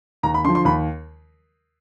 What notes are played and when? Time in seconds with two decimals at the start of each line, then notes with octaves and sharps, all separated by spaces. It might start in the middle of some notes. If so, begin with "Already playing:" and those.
0.23 D#2 A#5
0.34 B5
0.45 D3 F3 C6
0.55 C6
0.65 D#2 B5